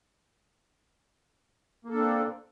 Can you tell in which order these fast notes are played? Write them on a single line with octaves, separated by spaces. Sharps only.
A#3 A4 D4 C4